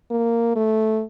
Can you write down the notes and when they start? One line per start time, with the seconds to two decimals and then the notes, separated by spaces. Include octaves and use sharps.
0.10 A#3
0.56 A3